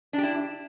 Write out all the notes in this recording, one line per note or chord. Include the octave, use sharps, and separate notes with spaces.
D4 E4 G4